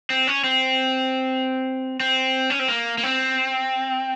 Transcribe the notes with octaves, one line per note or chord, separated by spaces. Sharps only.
C4
C#4
C4
C4
C#4
C4
A#3
A#3
C4